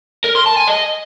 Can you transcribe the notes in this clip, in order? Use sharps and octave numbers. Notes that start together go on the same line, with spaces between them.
A#4
C6
A5
G#5
D#5